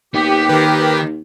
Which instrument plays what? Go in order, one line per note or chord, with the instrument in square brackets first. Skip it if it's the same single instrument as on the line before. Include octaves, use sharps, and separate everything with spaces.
[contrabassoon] D#2 [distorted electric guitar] B3 [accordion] G4
[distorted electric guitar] D#3 [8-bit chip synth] A#4 B4